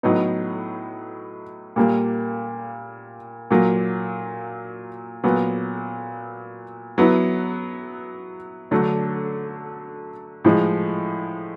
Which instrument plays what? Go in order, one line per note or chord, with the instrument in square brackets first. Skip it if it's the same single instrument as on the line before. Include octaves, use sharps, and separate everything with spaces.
[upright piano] A2 F#3 B3 D#4
A#2 G3 A#3
A#2 F#3 A#3
A#2 F#3 B3
F#3 B3 E4
D3 F#3 A3 D4
A2 F3 G#3